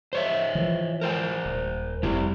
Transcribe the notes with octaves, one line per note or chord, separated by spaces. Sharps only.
C5 C#5 E5
E3 F3
A#4 C5 G5
D#1
F1 G3 E4 G4